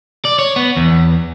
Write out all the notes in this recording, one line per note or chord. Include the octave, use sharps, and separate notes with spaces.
D5
C#5
B3
E2